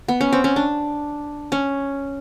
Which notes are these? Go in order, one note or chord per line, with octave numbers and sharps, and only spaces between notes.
B3
C#4
C4
C#4
D4
C#4